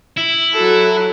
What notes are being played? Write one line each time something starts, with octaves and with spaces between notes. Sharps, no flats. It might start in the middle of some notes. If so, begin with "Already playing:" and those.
E4
F#3 F#4 A4